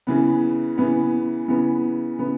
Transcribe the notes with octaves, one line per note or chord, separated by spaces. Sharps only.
C#3 E3 B3
C#3 E3 B3
C#3 E3 B3
C#3 E3 B3